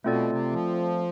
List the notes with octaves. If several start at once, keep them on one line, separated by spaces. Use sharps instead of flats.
B2 A3 C4 F4 A4 D5
C3
F3